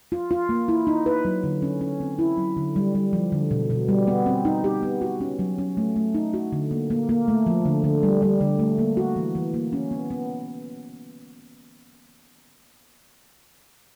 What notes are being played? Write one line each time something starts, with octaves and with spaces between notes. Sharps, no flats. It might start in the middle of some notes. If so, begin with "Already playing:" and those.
F4
F4
A#3
E4
D#4
B4
F#3
D3
C#4
C#4
C4
E4
F#3
D3
G3
G3
F3
D3
B2
B2
G3
B3
C4
D#4
G4
B3
F#4
C#4
F#3
C#4
A3
A3
D#4
F#4
D3
A#3
A#3
A#3
A3
F3
D3
D3
G3
G3
D3
A3
A#3
F#4
E3
E3
A#3
C#4
B3
B3